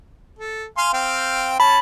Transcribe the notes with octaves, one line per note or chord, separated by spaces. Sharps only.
A4
F5 G#5 C6
C4 F5 G5
C#4 A5 B5